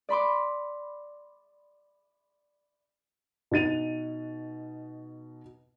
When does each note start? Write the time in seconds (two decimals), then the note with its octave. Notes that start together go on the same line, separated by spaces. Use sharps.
0.09 D5 B5 C6 D6
3.51 B2 D#4 A6 D#7 F7